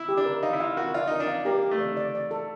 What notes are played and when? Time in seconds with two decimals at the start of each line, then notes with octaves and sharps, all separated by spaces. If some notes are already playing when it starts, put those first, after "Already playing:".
Already playing: E4
0.09 G4
0.17 D4
0.26 A#4
0.43 D#4 F5
0.53 E4
0.60 F4 F5
0.77 F#4 A#4
0.94 F4 D5
1.07 D#4 A#4
1.20 D4
1.28 F5
1.45 A#3 G4
1.62 G4
1.71 A3
1.80 D5
1.97 D5
2.15 D5
2.31 A4